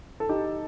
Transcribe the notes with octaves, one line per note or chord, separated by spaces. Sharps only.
A4
D#4 G4